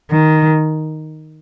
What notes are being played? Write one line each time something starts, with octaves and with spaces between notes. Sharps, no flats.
D#3